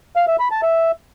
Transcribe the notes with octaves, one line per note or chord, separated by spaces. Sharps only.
F5
E5
B5
A5
E5